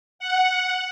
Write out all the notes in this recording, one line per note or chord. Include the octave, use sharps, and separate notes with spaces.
F#5